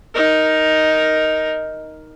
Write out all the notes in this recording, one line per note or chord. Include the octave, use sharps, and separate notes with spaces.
D#4 A#4